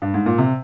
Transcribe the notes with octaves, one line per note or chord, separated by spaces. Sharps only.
G2
G#2
A#2
C3